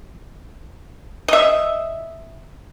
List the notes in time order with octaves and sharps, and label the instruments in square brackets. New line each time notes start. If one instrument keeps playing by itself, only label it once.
[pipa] D#5 E5